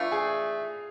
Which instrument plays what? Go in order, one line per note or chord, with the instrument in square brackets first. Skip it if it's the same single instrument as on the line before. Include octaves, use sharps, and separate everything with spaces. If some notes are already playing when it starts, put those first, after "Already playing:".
Already playing: [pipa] E3 A3 D4 [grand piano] F4 F5
[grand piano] G#4 G#5